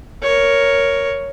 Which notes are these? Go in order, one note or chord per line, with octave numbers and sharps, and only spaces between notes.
A#4 C#5